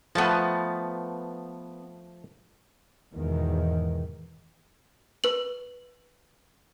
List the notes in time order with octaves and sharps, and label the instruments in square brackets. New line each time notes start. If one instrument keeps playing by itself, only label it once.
[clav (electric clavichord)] F3 A3 [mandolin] B3 A5
[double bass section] E2 G#2 B2 D#3
[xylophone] B4 F#7